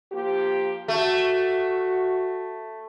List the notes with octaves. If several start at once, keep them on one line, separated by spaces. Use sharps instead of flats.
F3 A#3 G4
A3 F#4